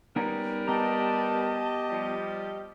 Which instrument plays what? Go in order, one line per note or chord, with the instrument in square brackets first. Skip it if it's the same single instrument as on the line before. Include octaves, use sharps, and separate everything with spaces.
[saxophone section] G3 A#4 B4 [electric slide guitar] B3 C#4 D#4
[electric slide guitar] B3 A#5 [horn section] G4 D#5 [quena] A5
[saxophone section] F3 G3